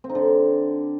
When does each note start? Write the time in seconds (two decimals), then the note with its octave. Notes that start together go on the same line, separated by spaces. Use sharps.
0.04 C4
0.09 D#4
0.15 D3